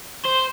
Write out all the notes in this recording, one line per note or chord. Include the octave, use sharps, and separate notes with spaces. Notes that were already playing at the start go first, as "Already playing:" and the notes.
C5